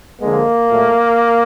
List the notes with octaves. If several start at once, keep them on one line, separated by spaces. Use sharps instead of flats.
D3 F3 G#3 A#3
A#2 F#3 A3